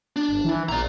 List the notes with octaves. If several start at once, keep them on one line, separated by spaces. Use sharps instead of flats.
D4
G1
E3
A#1 D5 A#5